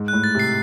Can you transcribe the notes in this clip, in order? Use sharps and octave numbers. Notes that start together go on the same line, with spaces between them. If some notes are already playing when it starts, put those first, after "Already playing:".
Already playing: G#2
A2 F#6
A6
C3 C7